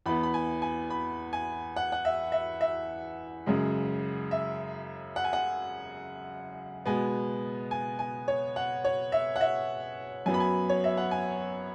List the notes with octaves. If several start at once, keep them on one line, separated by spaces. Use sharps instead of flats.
E2 E3 B3 B5
B5
G#5
G#5
B5
G#5
F#5
F#5
E5
E5
E5
F#2 C#3 G#3
E5
F#5
G#5
F#5
B2 G#3 B3 G#5
G#5
G#5
C#5
F#5
C#5
E5
F#5
E5
F#2 F#3 B3 G#5
B5
G#5
C#5
E5
F#5
G#5